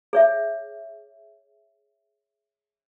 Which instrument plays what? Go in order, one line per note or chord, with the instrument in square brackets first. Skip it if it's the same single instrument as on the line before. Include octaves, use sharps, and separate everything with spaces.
[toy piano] G#4 C#5 E5